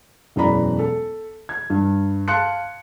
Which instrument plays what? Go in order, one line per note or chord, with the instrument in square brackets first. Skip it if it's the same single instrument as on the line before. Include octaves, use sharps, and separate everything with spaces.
[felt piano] E1 F#2 E3 D5 A#5 B5
A4
G#6
G2
F5 A5 C6 F#6 C#7